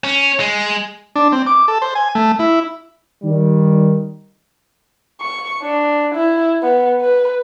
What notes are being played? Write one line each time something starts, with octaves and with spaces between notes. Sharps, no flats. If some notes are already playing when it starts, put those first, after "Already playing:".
C#4
G#3
D4
C4
D6
A4
C5
G#5
A3
E4
D#3 G3
C#6
D4
E4
B3
B4